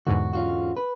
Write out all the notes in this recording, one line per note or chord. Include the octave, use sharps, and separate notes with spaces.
E2 G#2 D3 F#4
C#4 F4 F#4
B4